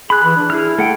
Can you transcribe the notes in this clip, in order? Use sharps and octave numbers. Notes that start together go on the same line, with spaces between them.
G#4 B5 F#6
E3
D4
E4 G#4 F6
A3 F#5 G5